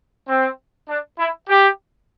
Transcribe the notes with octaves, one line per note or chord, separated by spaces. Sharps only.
C4
D4
E4
G4